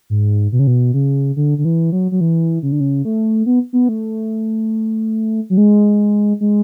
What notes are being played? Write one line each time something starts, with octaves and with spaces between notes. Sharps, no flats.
G#2
B2
C#3
B2
C#3
D3
D3
E3
F#3
F#3
E3
C#3
D3
C#3
A3
B3
B3
A3
F#3
G#3
G#3